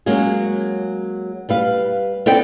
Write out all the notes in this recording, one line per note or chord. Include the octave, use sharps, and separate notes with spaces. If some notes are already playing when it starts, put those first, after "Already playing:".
F#3 G#3 A#3 C#4 G#4
G3 B4 F5
B3 C4 A4 D5 D#5 G5